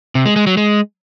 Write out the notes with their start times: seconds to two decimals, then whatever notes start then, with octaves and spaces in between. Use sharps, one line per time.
0.15 C3
0.26 G#3
0.36 G#3
0.47 F#3
0.57 G#3